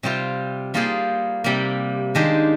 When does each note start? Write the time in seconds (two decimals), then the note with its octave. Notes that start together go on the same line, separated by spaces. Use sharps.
0.03 C3 G3 C4 F4 C5
0.74 G3 A#3 F4 G#4 C5
1.44 C3 G3 A#3
2.15 D#3 G#3 D4 G4 C5